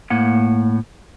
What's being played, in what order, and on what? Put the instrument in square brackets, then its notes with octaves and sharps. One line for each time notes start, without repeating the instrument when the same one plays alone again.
[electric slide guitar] A2 A#3 F#5